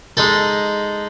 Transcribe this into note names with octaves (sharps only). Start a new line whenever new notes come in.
G#3 D#4 A4